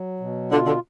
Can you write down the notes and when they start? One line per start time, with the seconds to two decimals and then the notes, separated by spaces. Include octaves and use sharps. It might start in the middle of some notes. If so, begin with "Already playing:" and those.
Already playing: F#3
0.20 B2
0.51 D3 F4
0.66 D3